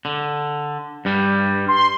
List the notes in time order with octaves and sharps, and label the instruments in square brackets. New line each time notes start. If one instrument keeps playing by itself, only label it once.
[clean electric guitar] D3
G2 G3
[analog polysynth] C6